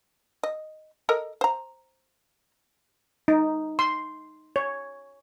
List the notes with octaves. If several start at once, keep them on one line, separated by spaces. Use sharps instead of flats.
D#5
A4 A#4 D#5
C5 A#5
D#4
C6
C#5